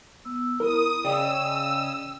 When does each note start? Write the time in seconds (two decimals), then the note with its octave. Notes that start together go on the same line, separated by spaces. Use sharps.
0.25 B3 E6
0.60 E4 A#4 B5 D#6
1.04 C#3 D5 D#5 G5 D#6 E6